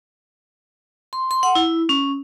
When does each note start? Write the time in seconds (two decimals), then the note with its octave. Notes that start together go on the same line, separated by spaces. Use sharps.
1.13 C6
1.31 C6
1.43 F#5
1.55 E4
1.89 C#4